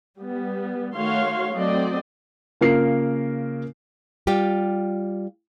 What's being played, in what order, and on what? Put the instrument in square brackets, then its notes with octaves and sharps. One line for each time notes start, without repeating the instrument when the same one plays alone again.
[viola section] G3 B3
D#3 A3 F#4 C#5 F5 C6
F#3 A3 C4 D5 D#5
[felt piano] C#3 A#3 F4 A#4 C7
[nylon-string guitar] G3 F4 G4